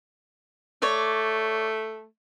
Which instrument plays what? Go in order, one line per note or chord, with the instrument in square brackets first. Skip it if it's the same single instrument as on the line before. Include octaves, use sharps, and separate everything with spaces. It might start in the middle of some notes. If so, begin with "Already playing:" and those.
[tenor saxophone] A3 [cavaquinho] C#5 D5